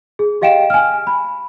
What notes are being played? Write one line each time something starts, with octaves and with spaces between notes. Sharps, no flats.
G#4
G4 D#5 F5 G5 D7 E7
G#5 F6
B5